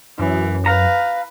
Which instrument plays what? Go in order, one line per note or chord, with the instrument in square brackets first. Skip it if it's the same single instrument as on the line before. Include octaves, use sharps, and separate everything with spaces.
[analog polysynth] F#2 [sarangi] E3
[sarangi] B4 [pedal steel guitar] F5 A#5